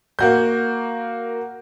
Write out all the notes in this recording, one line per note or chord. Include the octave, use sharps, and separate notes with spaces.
A#3 F#4 G6